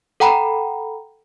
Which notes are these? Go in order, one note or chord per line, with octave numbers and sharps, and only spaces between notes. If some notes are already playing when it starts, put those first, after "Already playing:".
A4 F#5 G5 A#5 B5